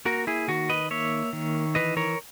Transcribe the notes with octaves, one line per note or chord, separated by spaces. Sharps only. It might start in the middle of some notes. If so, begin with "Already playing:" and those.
A#3 F#4 A#4
E4 G#4
D#3 F#4
B4 D#5
A#3 C#5 E5
D#3
E3 B4 D#5
A#4 C#5